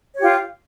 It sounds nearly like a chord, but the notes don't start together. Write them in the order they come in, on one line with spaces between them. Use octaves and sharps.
C#5 G4 F4